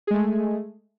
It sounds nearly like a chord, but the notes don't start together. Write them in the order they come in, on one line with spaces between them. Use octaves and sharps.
G#4 G#3 A3